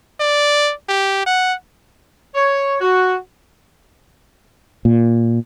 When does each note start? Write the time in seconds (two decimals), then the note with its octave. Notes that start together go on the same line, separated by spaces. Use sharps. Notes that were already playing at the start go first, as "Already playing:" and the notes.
0.20 D5
0.89 G4
1.26 F#5
2.35 C#5
2.81 F#4
4.85 A#2